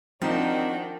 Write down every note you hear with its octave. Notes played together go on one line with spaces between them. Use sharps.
D#3 F3 C4 D4 D#4 F#4